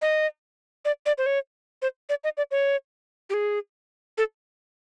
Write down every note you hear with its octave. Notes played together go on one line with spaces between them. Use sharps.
D#5
D5
D5
C5
C#5
C5
D5
D#5
D5
C#5
G4
G#4
A4